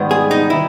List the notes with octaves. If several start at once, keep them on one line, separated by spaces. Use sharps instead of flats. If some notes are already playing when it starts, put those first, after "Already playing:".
Already playing: G#2 D#3 G3 B3
G#4
D#4
D#3 E4